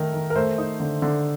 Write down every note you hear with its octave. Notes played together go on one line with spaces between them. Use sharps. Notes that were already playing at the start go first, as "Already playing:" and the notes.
Already playing: D#3 A3 D#4 A#4
D#3
A#4
A3 C5
D#4
D3
D3